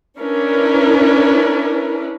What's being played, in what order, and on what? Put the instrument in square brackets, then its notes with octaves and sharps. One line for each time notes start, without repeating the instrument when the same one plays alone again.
[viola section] C#4 D4 E4 A#4 B4